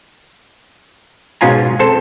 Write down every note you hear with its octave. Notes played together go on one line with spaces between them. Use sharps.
G#2 B2 C#4 F4 G#5 A#5
C4 A4 C5